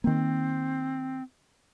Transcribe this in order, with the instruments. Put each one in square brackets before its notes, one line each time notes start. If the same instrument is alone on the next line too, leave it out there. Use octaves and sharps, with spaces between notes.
[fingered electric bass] D#3 A#3 [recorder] C4